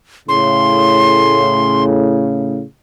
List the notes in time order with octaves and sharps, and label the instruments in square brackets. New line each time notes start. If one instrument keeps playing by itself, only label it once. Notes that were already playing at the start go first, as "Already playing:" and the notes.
[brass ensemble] A2 C#3 [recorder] C6